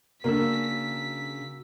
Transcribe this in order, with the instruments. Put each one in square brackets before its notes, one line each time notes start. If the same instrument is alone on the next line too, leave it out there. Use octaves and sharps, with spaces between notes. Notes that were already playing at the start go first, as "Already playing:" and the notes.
[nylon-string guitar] C#3 D4 [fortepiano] A#3 [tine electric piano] F#4 E6 [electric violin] B6